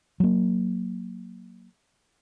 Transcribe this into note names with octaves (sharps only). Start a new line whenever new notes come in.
F#3 A#3